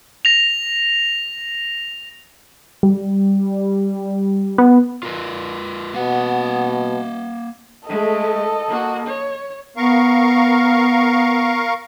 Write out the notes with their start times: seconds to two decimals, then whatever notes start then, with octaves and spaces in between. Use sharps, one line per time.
0.25 A#6 F7
2.83 G3
4.58 B3
5.03 F4 A#4 B4
5.94 B2 A#3 F#5
7.89 G#3 A3 A4 D#5
8.68 A#3 F#4
9.06 C#5
9.77 B3 A#4 F5 C#6